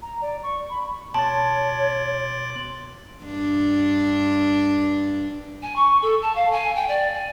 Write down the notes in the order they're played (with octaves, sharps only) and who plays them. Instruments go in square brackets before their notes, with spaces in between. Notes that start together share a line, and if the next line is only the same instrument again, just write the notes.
[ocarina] A#5
D5
C#6
B5
[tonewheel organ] B2 D6 F#6 [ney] C#5 [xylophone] A5 [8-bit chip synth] C6 A6
[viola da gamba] G2 D4
[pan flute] G#5
C#6
A4
A5
F5
G#5
G5
D5
G#5